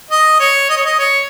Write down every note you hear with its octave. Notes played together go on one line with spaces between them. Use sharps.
D#5
C#5
D#5
C#5
D#5
C#5